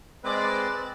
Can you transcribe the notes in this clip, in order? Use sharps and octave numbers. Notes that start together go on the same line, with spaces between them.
G#3 C4 B4 D5